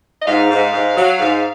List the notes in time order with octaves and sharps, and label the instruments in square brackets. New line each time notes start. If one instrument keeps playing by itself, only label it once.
[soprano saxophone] D#5
[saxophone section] G#2 [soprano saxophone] F5
[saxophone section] G#2
G#2
F#3
G#2